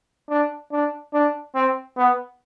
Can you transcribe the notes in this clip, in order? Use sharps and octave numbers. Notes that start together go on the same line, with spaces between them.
D4
D4
D4
C4
B3